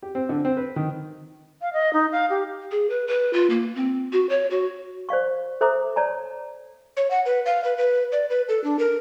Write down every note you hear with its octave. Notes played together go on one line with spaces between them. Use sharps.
G4
C4
D3
C4
B4
D#3
F5
D#5
D#4
F5
G4
G#4
B4
B4
F4
A#3
C4
F#4
C#5
F#4
C5 D5 F5 C#6
A4 C5 E5 A#5 D6 D#6
C#5 D5 A5 A#5
C#5
F#5
B4
F5
B4
B4
D5
B4
A4
D4
A#4